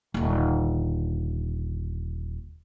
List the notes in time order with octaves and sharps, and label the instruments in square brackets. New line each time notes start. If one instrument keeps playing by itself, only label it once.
[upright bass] D#1 D3